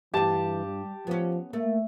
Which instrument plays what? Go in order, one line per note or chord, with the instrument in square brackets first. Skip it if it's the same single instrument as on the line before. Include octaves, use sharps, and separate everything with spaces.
[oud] G2 F4 [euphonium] E3 [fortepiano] G4 A5
[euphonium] G3
[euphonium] F3 [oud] B3 C#4
[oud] A3 [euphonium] A#3